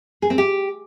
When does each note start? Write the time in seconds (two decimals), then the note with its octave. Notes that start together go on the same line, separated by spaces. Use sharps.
0.22 G#4
0.30 C4
0.38 G4